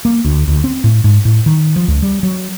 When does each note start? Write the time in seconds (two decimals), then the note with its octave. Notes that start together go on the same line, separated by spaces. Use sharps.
0.05 A#3
0.24 D2
0.48 D2
0.64 C4
0.84 A2
1.04 G#2
1.25 A2
1.46 D#3
1.76 F3
1.88 C#2
2.02 G3
2.23 F#3